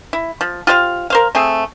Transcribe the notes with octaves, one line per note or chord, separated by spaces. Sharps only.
E4
F3
F4 G4 C5 F5
A#4 C5 F5
A3 C4 G#4